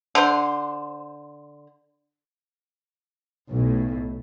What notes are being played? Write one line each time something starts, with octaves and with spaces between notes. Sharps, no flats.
D3 C5
B1 A2